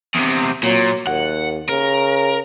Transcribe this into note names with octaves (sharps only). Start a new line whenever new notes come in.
E2 C3
A#2 F#3
D#2 F#5
C#3 A#4